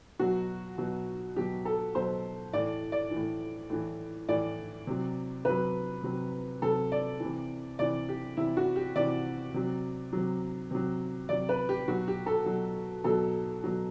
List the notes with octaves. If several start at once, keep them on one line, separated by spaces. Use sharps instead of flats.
B2 F#3 F#4
B2 F#3
B2 F#3 G4
A4
B2 F#3 C5
A2 E3 D5
D5
E3
A2
A2 E3
A2 E3 D5
C3 F#3
C3 F#3 B4
C3 F#3
C3 F#3 A4
D5
C3 E3
C3 E3 D5
G4
C3 E3 E4
F#4
G4
C3 E3 D5
C3 F#3
C3 F#3
C3 F#3
C3 F#3 D5
B4
G4
B2 F#3 F#4
G4
A4
B2 F#3
B2 F#3 A4
B2 F#3